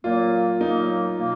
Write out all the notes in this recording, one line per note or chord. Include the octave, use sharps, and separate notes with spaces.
A#2 F#3 A#3 F4
A#2 F#3 A#3 D#4
B2 A#3